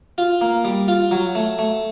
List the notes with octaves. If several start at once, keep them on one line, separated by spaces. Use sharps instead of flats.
F4
A#3
G3
F4
F#3
A3
A3